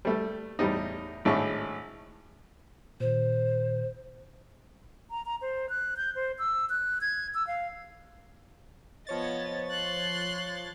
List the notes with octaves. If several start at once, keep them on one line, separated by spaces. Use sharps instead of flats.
G3 A3
E2 A2 G3 D#4
G#1 A2 D4 G#4 C#6
A#2 D#3 C5
A#5
A#5
C5
F#6
G6
C5
E6
F#6
G#6
E6
F5
F3 B3 C#5 D#5 A6
C6 F#6